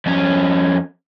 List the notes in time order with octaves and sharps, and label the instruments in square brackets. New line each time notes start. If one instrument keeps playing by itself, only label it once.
[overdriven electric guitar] F2 C#4